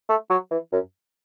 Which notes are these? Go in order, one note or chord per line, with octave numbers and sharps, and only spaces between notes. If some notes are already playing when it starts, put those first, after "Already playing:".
A3
F#3
E3
F#2